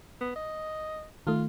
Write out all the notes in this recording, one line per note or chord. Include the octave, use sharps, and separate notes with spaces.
B3
D#5
D#3 A3 F4